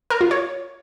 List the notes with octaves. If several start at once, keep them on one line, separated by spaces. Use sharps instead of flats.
A#4
F4
C#5